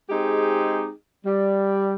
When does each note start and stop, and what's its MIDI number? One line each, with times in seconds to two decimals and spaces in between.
0.10 0.89 56
0.10 0.89 60
0.10 0.89 63
0.10 0.89 67
0.10 0.89 68
1.24 1.94 55